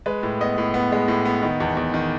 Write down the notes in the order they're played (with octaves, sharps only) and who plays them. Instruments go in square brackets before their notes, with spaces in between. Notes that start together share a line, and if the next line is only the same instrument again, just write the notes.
[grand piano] G#3 B4
A2
B3 D#5
A2
B3
G#3
A2
B3
D#3
E2
E2
D#3